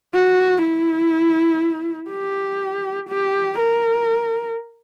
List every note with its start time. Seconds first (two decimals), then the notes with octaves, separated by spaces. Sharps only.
0.14 F#4
0.63 E4
2.11 G4
3.09 G4
3.59 A#4